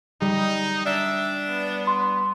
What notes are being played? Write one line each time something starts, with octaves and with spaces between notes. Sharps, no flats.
G3 D#4
D4 E5
B3
C6